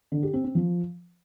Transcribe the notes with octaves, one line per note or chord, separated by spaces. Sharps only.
D3
G4
C4
C4
F3